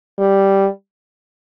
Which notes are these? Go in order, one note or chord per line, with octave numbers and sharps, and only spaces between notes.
G3